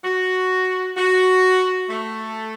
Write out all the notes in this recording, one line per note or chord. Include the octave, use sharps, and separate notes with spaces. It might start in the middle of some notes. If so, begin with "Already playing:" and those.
F#4
F#4
A3